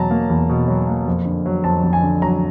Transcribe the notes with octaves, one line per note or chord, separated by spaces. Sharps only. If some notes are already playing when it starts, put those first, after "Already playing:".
Already playing: E2 B2 F#3 A5 A#5
A#3
E2
B2
F#3
A#3
F2
D3
F#3
F2 A5
F2
G#5
D3
F#3 A#5